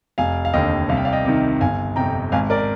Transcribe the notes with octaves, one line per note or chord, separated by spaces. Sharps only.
F1 F5 G#5
F5
D#2 D3 D#5 G5
C2 F5
G5
D5 F5
D#5 G5
C3 D#3
G1 F5 G#5
F2 C3 G5 A#5
G#1 F5 G#5
A#4 D5